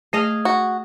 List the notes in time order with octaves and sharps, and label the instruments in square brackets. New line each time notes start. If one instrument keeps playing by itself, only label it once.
[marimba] A3 [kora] G#4 D#5 F5
[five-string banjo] F#4